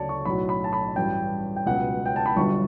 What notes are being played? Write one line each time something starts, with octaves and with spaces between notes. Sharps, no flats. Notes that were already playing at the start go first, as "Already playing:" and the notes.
Already playing: D2 C#3 F#3 C#5 D5 A5
C#6
B1 A2 F#3 B5
B5
A5
B5
A1 G2 F#3 G5
G5
C#2 B2 F#3 F#5
G5
A5
B5
G1 G2 D3 F#3 C#6